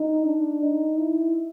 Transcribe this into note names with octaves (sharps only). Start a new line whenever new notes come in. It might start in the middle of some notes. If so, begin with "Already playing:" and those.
Already playing: D#4
D4
D#4
E4